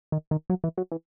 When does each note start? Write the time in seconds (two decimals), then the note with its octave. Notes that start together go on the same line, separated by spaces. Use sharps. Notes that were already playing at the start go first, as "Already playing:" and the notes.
0.12 D#3
0.31 D#3
0.50 F#3
0.64 E3
0.77 F#3
0.92 E3